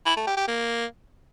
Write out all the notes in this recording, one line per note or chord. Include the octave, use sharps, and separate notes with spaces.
E4
A3
G4
G4
A#3